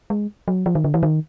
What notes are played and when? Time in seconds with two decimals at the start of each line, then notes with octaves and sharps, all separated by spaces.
0.10 G#3
0.48 F#3
0.66 F3
0.75 D#3
0.84 D3
0.94 E3
1.03 D#3